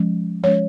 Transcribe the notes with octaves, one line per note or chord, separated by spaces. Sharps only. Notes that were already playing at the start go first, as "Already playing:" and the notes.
Already playing: F3 G#3 C#4
F3 G#3 C#4 C#5